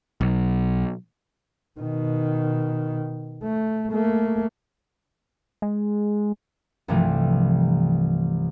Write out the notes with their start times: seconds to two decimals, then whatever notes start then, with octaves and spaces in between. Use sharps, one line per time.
0.21 B1
1.79 B2 D#3
3.43 A3
3.92 A3 A#3
5.62 G#3
6.88 C2 G2 C3 E3 F3 A3